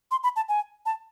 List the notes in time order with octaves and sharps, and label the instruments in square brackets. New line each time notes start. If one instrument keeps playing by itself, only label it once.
[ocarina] C6
B5
A5
G#5
A5